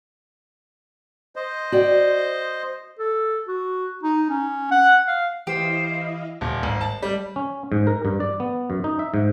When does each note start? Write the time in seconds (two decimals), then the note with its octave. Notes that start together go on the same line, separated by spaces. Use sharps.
1.36 C5 D#5
1.72 F#4 D5 G5
2.99 A4
3.48 F#4
4.03 D#4
4.30 C#4
4.71 F#5
5.08 F5
5.47 E3 E4 G4 C5 D#5 F5
6.41 D#1
6.63 G#1
6.81 A5
7.02 G3
7.36 C#4
7.72 G#2
7.87 A#4
8.05 G2
8.20 D5
8.40 B3
8.70 F#2
8.84 D#4
8.99 E5
9.14 G#2